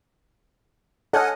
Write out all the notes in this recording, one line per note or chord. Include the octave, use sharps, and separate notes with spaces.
A4 C#5 D#5 F#5 G#5 F6 F#6